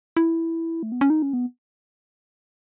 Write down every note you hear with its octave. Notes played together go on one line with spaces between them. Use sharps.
E4
A3
B3
C#4
D#4
C#4
B3